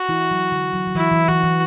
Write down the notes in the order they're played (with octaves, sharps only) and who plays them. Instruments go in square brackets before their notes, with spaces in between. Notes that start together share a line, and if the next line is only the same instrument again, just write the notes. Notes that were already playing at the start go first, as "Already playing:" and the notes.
Already playing: [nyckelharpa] F#4
[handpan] E3 E4
F#3
D3
F#3
F#3
[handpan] E3 [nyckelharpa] E4
[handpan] E3
[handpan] E3 [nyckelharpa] F#4
[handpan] E3